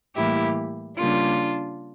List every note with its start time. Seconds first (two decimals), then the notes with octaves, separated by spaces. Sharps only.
0.15 A2 E3 G3 A#3 E4 G4
0.98 C#3 G3 A#3 D4 F4